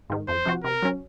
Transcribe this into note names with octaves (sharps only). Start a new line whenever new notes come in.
G#2 D#3
F2 C5
C3 F3 C4 F#4
C3 A#4
F#3 C#4